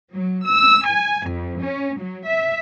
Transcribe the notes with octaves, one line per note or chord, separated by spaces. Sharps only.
F#3
E6
G#5
F2
C#4
F#3
E5